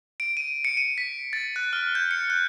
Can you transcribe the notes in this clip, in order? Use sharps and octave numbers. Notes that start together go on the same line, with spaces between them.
D7
D#7
C#7
D#7
B6
A6
F#6
F6
G6
C#7
F#6